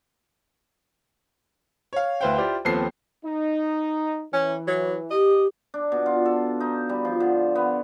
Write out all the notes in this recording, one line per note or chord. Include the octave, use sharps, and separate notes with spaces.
C#5 F5
D2 E4 B4 C5 F5 G5
E4 F4 G4 C5 D5
D#2 F3 B3 C4 A4 C7
D#4
E3 C#4
F#3
G4 D#5
D4
B2
F4
A4
D#4
G3
F3
D3
B3